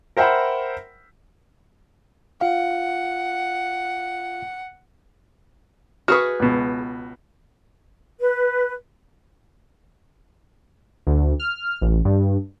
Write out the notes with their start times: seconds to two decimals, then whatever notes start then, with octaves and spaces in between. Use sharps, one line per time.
0.17 A#4 C5 E5 F#5 G5 B5
2.41 F4 F5 F#5
6.08 F#4 G#4 B4 C#6 F6
6.40 C#2 B2
8.20 B4
11.07 D2
11.40 F6
11.82 A1
12.05 G2